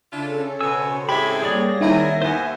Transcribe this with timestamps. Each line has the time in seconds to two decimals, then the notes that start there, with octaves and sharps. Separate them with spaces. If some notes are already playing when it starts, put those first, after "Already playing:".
0.11 C#3 C#4 D4 E4 F4 A4
0.61 B2 C#4 C5 C#5 G#5 E6
1.09 A2 G#3 C4 G4 E5 G5 B5 G#6
1.42 G3 A#3 G#4 C#5 D5 A#6
1.81 D#3 F#3 C4 C#4 E4 E5 A#6
2.22 D#2 B3 C5 G#5